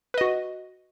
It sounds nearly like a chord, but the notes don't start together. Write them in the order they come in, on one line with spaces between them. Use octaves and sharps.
B4 D#5 F#4